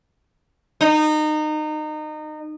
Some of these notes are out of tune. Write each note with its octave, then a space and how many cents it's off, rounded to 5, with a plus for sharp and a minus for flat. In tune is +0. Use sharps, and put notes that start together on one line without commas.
D#4 -25